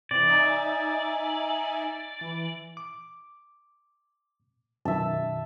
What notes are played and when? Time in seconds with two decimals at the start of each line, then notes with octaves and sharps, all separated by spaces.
0.11 C3 E3 D5
0.28 D#4 E5 G#5
2.21 E3
2.77 D6
4.85 F#2 B2 D#3 E5 A5